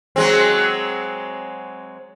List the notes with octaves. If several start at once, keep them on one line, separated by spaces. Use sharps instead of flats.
F#3 G#3 C4